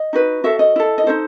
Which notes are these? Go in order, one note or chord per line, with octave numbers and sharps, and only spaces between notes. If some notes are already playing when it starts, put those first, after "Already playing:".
Already playing: D#5
D#4 F#4 B4
F#4 A4 E5
D#5
E4 A4
D#5
D#4 F#4 A4 C5